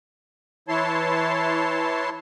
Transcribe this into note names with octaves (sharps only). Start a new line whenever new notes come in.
E3 E4 C#5 A5 C6